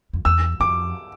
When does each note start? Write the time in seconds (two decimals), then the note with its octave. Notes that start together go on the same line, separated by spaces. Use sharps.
0.13 F2
0.25 E2 E6
0.60 F2 D6